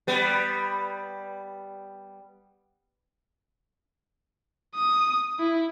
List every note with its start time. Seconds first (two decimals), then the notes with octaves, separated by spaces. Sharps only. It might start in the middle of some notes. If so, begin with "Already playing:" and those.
0.07 G3 B3
4.76 D#6
5.39 E4